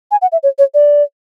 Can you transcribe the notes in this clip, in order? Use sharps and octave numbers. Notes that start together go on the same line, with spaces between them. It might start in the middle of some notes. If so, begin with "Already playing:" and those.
G#5
F#5
E5
C#5
C#5
D5